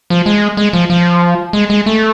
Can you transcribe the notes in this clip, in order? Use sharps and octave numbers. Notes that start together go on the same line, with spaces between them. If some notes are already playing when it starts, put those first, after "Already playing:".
F3
G#3
G#3
F3
F3
G#3
G#3
A3